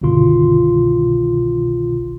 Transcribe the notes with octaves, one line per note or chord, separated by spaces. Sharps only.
G1 C2 B2 D#3 F4 C6